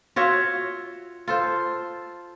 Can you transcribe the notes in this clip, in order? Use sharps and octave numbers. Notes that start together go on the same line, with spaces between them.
F4 F#4 C#5 E5
F4 A4 C5